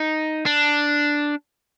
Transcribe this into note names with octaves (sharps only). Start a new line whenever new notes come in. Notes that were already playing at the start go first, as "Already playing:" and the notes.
Already playing: D#4
D4